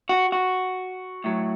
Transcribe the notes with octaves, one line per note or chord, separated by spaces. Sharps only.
F#4
F#4
A2 F#3